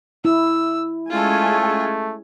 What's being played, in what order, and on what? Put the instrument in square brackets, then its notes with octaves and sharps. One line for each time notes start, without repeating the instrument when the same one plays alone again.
[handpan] E4 [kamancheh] E6
[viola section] G#3 C#4 G#5 [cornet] A3 [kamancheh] F4 A4